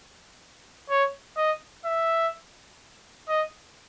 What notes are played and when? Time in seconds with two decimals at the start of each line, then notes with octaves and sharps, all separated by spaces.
0.90 C#5
1.37 D#5
1.86 E5
3.29 D#5